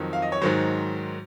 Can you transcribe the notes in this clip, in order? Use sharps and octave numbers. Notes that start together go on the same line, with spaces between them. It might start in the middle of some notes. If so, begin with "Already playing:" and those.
Already playing: F2 D#3 F#3
F5
D#5
C#5
G#2 D#3 F#3 C5